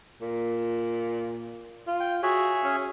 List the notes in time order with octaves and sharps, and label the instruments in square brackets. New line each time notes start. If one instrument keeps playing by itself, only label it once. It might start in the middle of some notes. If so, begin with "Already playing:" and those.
[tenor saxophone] A#2
F4
[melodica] G5
[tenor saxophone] F#4 [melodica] G#4 C#5 E5
[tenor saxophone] C#4